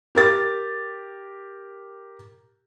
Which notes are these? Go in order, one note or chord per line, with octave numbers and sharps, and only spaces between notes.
G4 A#4 A6